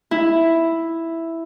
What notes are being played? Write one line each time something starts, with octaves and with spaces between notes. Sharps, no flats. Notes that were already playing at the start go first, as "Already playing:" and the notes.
E4